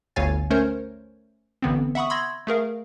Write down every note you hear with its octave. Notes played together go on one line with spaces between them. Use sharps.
G1 D2 C#5 F5 G#5 A6
A3 C#4 A#4 C5 C#5
A1 D3 B3 C4
E5 F#5 B5 C#6 D#6
B5 C6 E6 G#6 A#6
A3 G#4 A#4 F5